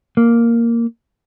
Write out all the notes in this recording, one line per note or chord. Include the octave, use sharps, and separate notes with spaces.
A#3